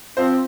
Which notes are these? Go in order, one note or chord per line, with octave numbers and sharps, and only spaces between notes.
F3 C4 C5